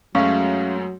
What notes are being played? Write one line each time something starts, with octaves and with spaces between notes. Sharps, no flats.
F#2 F#3 G#3 A3 C#4 F5